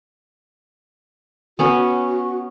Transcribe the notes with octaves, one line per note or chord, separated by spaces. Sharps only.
B3 C#4 F#4 C#5